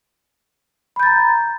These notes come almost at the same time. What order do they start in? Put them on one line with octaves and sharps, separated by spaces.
B5 G6 A6 A#5